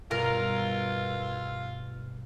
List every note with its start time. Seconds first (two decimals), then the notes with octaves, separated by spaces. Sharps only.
0.11 G2 B2 F4 A#4